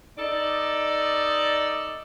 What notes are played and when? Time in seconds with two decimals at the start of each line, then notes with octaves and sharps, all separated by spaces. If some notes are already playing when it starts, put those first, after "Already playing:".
0.18 D#4 A4 D5